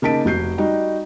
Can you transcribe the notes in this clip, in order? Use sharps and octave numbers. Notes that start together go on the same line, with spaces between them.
C#3 A#3 D#4 A5 B6 D7
F1 F#4 G6 C7
G3 D#4 F#4